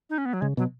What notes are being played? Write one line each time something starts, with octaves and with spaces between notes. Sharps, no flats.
D#4
C#4
B3
F#3
C#3 G#3
B2 F#3